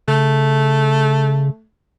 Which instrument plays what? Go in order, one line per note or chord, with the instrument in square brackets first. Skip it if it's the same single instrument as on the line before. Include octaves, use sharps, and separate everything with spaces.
[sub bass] C#3 [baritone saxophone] A3